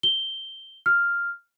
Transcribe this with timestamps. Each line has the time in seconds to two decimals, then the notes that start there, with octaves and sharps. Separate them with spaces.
0.03 G7
0.86 F6